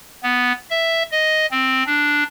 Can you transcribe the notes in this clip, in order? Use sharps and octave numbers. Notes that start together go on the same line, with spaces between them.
B3
E5
D#5
C4
D4